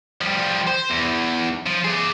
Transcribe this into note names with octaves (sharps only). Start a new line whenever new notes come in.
F3 G3
C5
E2
F3
G#4 D5